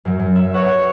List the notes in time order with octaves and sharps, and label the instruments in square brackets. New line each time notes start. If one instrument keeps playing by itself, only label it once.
[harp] F#2 F#3
F#2
E5
[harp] B4 E5 F#5 [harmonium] C#5